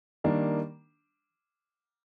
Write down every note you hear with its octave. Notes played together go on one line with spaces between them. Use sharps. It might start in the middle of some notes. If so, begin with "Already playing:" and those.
D#3 G3 A#3 D4